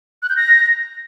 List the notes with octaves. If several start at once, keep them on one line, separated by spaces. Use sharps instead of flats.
F#6
G6
A#6